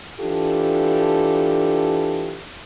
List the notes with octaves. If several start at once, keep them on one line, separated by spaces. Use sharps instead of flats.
E3 D4 F4 G4 A4